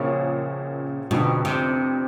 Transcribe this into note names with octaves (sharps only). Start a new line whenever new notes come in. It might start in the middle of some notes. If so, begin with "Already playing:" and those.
Already playing: A#1 A#2 C#3 F3 A#3 C#4
F1 F2 B2 D3
C3